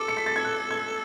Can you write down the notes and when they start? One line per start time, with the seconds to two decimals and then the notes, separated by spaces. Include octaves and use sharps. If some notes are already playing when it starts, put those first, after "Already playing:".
Already playing: A4 D6 E6
0.08 C#7
0.17 B6
0.26 A6
0.36 G#6
0.45 F#6
0.71 G#6